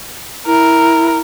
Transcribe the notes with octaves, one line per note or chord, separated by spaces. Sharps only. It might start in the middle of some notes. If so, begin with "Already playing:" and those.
E4 A#4